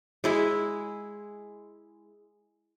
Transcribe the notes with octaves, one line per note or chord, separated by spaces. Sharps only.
G#3 E4 G#4